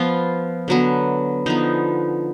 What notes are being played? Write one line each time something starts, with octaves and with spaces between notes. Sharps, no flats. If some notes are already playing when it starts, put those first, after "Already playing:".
Already playing: F3 B3 F4
D3 F#3 B3
D3 F3 B3 D#4